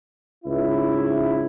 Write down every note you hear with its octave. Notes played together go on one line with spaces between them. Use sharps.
C#2 G#2 E4